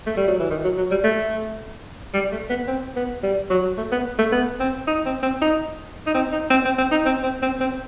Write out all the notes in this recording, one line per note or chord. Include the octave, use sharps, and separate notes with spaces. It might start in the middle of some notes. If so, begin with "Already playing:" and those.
A3
G3
F#3
E3
D#3
F#3
F#3
G3
A3
G3
A3
B3
C4
B3
G3
F#3
A3
B3
A3
B3
C4
D#4
C4
C4
D#4
D#4
C4
D#4
C4
C4
C4
D#4
C4
C4
C4
C4